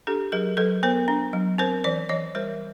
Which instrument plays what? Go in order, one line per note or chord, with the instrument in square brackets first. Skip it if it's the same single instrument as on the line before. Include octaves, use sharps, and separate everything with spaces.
[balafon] D4 G4 A4
F#3 G#4 A#4
F#3 A4 B4
B3 A#4 C5
D4
F#3
C4 A#4 C5
E3 C5 D5
E3 C#5 D#5
G3 A#4 C5